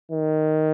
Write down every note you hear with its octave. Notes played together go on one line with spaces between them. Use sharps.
D#3